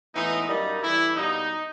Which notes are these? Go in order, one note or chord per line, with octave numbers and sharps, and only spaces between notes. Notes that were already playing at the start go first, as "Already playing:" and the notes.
A2 E3 G#3 B3 D#4
F#2 D#3 G3 A#3 D#4
G2 E3 A3 D4 E4
B2 G3 A#3 D#4